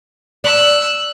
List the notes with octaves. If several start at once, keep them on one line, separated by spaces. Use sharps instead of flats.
D5 E6 F#6